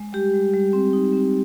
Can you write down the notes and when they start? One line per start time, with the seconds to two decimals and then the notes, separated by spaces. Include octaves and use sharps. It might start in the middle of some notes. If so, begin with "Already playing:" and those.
Already playing: G#3
0.13 G3 G4
0.33 G3
0.54 G3
0.73 C4
0.93 D#4
1.13 C4